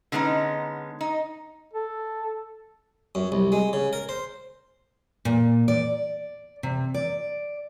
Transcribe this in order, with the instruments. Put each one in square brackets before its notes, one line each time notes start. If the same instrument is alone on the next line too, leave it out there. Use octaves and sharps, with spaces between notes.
[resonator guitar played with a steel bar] D3 G#3 B3 C#4 D#4
D#4
[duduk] A4
[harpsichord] F#2
C2
G#3
C#3
A#4
C5
[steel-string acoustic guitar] A#2
D5
C3
D5